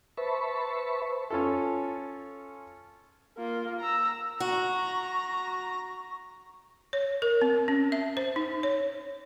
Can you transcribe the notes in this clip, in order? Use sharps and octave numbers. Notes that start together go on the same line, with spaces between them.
B4 C5 E5 A5 B5 C#6
C#4 F4 A4
A#3 F4
A#5 E6
F#4 A#5 C#6 A#6
C#5
A#4
C4
C#4
E5
C5
D#4
C#5